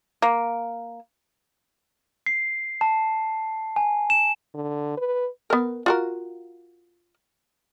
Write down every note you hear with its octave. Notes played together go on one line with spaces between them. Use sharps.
A#3
C7
A5
G#5
E7
D3
B4
B3 A#4
F4 F#4 A#4